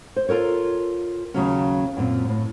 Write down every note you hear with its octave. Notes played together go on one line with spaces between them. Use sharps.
C5
F4 A4 A#4 C#5
D#2 C#3 F#3 C#4
F#2 A#2 C4
A2